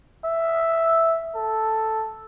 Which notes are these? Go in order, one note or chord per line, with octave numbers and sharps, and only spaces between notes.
E5
A4